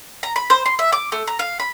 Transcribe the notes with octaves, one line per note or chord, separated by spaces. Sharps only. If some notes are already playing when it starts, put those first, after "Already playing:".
A#5
B5
C5
C6
E5
D6
A3
A#5
F5
B5